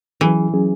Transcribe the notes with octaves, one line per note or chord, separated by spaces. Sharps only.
E3 F#3 C#4 G#4
F#3 C#4 G#4